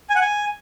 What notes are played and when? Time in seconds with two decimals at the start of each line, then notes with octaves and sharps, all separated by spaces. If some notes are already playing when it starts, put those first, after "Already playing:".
0.10 G#5
0.16 F#5
0.21 G#5